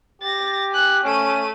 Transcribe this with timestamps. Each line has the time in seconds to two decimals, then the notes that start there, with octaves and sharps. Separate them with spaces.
0.22 G4 A6 A#6
0.72 G#5 F#6
1.04 A3 C#4 D#7